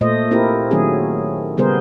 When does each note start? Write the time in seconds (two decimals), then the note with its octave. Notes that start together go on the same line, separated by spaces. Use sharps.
0.01 A#2 A3 C5 D#5
0.31 A#3 C4 E4 G4 A#4
0.71 D#3 F#3 A3 C4 C#4 G#4
1.57 C#3 G3 B3 G#4 A#4 C5